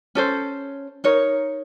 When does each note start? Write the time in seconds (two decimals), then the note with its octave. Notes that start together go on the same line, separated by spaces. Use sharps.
0.15 C#4 A4 C5
1.04 D#4 A#4 C#5